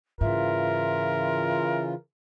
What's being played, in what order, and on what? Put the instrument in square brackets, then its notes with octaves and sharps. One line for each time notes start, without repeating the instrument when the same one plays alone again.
[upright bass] G#2 [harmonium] C#3 E3 F4 [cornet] A#4 [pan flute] E5